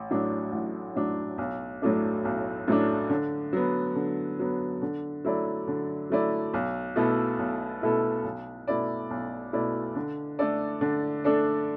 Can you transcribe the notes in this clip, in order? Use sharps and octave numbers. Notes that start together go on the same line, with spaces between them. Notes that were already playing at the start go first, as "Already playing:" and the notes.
Already playing: A1
A2 F#3 D4
A1
A2 F#3 D4
B1
A2 F#3 A3 D4
B1
A2 F#3 A3 D4
D3
F#3 B3
D3
F#3 B3
D3
F#3 A3 E4 D5
D3
F#3 A3 E4 D5
B1
B2 A3 E4 A4
B1
B2 A3 E4 A4
B1
B2 A3 E4 D5
B1
B2 A3 E4 D5
D3
A3 D4 A4 D5
D3
A3 D4 A4 D5